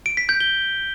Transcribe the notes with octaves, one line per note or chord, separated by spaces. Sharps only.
D7
B6
G6
G7